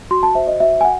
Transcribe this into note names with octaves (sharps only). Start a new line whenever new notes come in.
F#4 C6
A5
C5 E5
D#5
F#4 E5
G#5
F#5